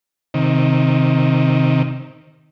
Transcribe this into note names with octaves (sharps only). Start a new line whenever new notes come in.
C3 D#3